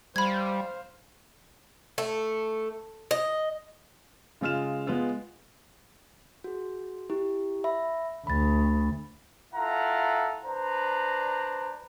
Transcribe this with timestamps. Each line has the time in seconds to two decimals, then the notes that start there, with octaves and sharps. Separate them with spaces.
0.16 G3 C5 F5 B5 G#6
1.98 A3
3.11 D#5
4.41 C#3 G#3 F4 F6 E7
4.87 G#3 B3 F4
6.44 F#4 G#4
7.10 E4 G4
7.64 E5 B5
8.27 D2 B5 A6
9.54 E4 F4 A4 F#5 A#5
10.45 D4 B4 C5 A#5